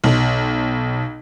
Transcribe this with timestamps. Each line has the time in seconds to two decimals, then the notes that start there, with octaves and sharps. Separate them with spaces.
0.04 B1